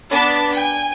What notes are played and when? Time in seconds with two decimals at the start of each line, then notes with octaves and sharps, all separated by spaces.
0.10 B3 D4 A5 D6 B6
0.53 G5 G#5